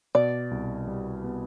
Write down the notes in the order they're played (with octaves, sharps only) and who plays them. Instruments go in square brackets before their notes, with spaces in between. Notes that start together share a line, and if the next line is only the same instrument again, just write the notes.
[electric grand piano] B2 [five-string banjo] D5
[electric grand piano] C2
G3
B3